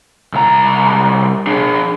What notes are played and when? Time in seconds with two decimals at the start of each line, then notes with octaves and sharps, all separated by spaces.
0.33 C2 A#5
1.47 D4 G#4